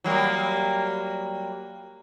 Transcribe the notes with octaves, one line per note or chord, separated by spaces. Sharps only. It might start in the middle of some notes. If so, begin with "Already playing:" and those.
F#3 G3 A#3